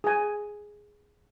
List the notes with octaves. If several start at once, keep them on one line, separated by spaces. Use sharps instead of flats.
G#4 G#5